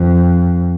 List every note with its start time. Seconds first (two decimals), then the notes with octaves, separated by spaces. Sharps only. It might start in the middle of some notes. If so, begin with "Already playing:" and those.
Already playing: F2